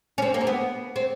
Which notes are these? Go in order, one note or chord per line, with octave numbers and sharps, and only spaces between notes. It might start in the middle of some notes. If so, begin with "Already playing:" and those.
C#4
C4
A#3
C4
B3
C4